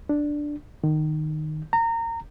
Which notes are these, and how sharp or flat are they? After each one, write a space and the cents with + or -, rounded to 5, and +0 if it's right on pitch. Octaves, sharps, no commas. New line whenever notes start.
D4 +0
D#3 -15
A#5 -25